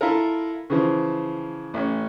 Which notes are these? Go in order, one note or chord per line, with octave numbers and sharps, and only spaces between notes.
E4 F4 A4 A#4
C#3 E3 F3
A1 C#4